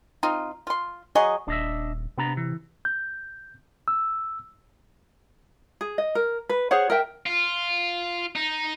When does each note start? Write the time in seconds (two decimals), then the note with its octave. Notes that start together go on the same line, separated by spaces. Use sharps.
0.23 C4 D#4 F4
0.67 F4 C6
1.15 F#3 G#4 D#5 C#6
1.48 D#1 D4 D#5 E5
2.18 C3 B3 D4 A#5
2.37 E3
2.85 G6
3.88 E6
5.81 G#4
5.98 D#5
6.15 A#4
6.49 B4
6.71 G#4 C5 C#5 F#5
6.90 A#4 E5 G5
7.26 F4
8.36 D#4